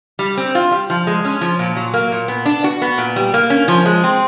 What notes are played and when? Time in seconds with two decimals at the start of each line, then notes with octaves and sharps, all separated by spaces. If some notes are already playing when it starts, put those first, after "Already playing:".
0.19 G3
0.37 C4
0.55 F4
0.71 G3
0.90 F3
1.07 G#3
1.25 C#4
1.41 F3
1.59 A#2
1.77 F#3
1.94 A#3
2.12 A#2
2.28 B3
2.45 D4
2.64 F#4
2.82 B3
2.98 A#2
3.16 G3
3.34 A#3
3.50 C#4
3.68 F3
3.86 G#3
4.04 C4